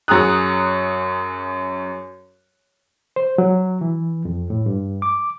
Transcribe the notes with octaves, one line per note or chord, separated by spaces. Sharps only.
F#2 F#4 G#4 A#5 D#6 F#6
C5
F#3
E3
F2
A2
G2
D6